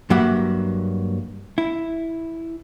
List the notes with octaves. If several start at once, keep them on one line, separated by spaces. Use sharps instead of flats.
G2 F#3 A#3 G4 E5 F#5
E4